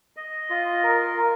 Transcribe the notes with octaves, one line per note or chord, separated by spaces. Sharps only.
D#5
F4
A#4
A#4